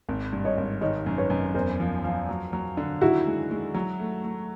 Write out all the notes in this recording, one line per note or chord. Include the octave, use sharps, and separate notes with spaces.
G#1
G2
C#5 D#5
G#1
D#3 C#5 D#5
F#2
B4 C#5
F#2
E2 A#4 C5
F3
F3
F#3
F#3
D3
D#3 E4 F#4
G#3
G#3
F#3
A3
A3